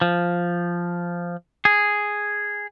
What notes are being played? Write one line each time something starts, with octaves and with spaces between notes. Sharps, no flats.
F3
G#4